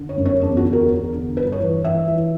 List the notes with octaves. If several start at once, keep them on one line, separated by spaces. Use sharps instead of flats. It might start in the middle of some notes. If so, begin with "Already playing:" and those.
Already playing: D3
C#5
F#2
C#5
E2 D4
F#4
D3
A#4
E2
D3
G2 B4
C#5
E3
E3 E5
E3